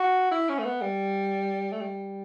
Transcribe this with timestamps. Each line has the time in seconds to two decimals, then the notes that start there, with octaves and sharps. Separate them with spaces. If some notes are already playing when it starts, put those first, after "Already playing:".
Already playing: F#4
0.31 E4
0.49 C#4
0.59 A3
0.64 B3
0.81 G3
1.72 A3
1.81 G3